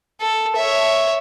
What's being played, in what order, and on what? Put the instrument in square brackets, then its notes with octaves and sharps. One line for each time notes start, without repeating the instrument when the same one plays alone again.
[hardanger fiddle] A4
C#5 E5